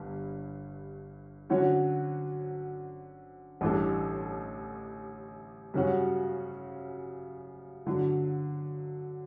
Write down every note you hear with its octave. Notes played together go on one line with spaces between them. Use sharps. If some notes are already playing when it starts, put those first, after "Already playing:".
Already playing: G1 G2
D3 F#3 C#4 F#4 C#5
A1 A2 G3 D4 A4
F#2 C#3 G3 C#4 F#4
D3 F#3